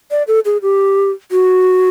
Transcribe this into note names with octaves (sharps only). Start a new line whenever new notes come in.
D5
A4
G#4
G4
F#4